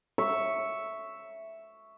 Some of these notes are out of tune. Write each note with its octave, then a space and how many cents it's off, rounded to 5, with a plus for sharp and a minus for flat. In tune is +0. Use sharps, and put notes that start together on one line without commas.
E5 +0 C#6 +0